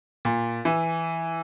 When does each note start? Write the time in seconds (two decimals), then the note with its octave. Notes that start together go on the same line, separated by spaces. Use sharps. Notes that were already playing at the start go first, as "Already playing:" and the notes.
0.25 A#2
0.65 E3